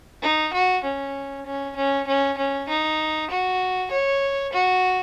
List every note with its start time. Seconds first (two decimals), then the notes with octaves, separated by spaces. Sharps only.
0.22 D#4
0.53 F#4
0.84 C#4
1.46 C#4
1.76 C#4
2.07 C#4
2.37 C#4
2.69 D#4
3.30 F#4
3.91 C#5
4.53 F#4